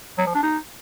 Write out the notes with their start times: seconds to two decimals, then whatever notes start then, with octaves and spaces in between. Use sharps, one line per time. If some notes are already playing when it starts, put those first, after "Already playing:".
0.18 F#3
0.26 F3
0.34 D4
0.43 D#4